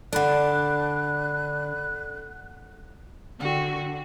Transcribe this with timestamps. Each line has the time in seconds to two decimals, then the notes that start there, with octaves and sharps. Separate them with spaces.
0.13 D3 D4 A4 D5 F#5 B5 F#6
3.40 D3 F#4 D5 G5